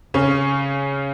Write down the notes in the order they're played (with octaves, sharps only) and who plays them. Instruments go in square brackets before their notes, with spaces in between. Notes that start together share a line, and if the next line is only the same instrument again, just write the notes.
[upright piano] C#3 C#4